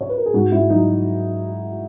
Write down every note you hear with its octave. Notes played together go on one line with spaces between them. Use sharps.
C#5
B4
A#4
G#4
G#2 F#4
G#2 E4
F#3 D#4